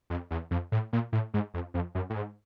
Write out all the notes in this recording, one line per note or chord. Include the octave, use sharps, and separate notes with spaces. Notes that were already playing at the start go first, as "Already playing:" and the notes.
F2
E2
F2
A2
A#2
A2
G#2
F2
F2
F#2
A2
G#2